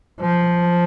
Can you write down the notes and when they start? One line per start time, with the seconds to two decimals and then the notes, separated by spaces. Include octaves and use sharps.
0.21 F3